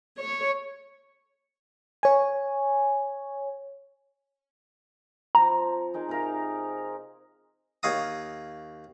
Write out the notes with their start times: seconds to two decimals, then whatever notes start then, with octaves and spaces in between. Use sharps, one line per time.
0.19 C#5
2.03 C#5 G#5
5.35 F3 C4 A#5
5.94 D#4 G#4 A#4
6.09 C3 A#4 F5
7.83 D#2 C#5 F5 A#5 D#6